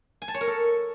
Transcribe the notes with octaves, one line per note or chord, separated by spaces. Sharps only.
G#5
A5
C#5
A#4
A4